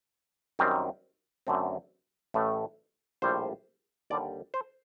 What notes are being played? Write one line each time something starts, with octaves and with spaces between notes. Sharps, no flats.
F#2 D#3 G3 C4
F#2 D3 A3 C4
A1 A2 A3
A#1 A2 G3 C5
D#2 D3 G3 D5
C5